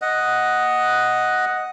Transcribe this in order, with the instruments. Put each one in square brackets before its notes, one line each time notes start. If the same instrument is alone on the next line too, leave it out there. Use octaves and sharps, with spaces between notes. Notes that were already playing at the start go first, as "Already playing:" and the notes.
[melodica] D#5 F#5